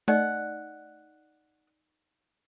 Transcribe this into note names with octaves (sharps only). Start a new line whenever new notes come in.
A3 D#4 D5 D#5 F#5